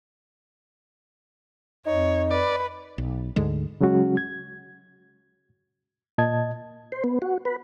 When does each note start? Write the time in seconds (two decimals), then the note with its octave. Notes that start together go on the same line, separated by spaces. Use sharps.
1.86 F2 D#4 C#5
2.31 B4 D5
2.98 B1
3.36 D2 G#2 D3 G#3
3.81 C#3 F#3 G#3 C#4 F#4
4.17 G#6
6.18 A#2 D#5 A5 G#6
6.92 C5
7.04 B3
7.22 F#4
7.45 B4